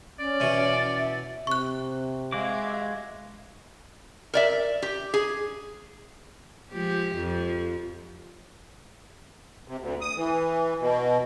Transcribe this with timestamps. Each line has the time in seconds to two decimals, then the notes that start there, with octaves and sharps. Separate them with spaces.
0.19 C#4 D5
0.40 B2 E3
0.98 E5
1.47 C3 C#6 F#6
2.32 G#3 F#4 E5 F5 D6
4.34 A#4 D5 E5
4.82 G4
5.14 G#4
6.73 F3 G#3 G4
7.16 F2 F3
9.68 C3
9.80 D2
10.01 D#6
10.16 E3
10.80 B2